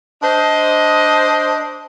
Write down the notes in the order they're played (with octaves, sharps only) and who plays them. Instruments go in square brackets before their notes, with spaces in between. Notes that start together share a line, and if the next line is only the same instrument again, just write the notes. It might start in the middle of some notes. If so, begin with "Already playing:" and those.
[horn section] D4 C5 D#5